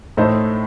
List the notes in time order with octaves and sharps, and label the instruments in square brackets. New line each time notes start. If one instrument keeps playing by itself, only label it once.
[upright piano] A2 A3 D#4 A4 C5